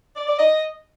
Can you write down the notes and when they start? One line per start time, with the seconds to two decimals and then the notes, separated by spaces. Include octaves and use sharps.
0.16 D5
0.27 D5
0.39 D#5